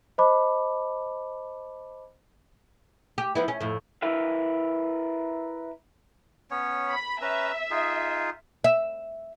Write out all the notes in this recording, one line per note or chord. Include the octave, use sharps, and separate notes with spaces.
C5 D#5 A5 B5 D6
G4
F3 B3 E4
C#4
F2 A2
E4 A#4 B4 E5 F5
B3 C#4 C#5
B5
C#4 B4 E5 A#5
D#4 F4 G#4
E5